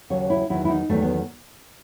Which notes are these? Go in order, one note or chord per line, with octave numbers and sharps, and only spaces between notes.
D#2 C#3 F#3 C#5
E4
E2 D#3 F#3 E4
E4
D#4
E2 D#3 F#3 A3
B3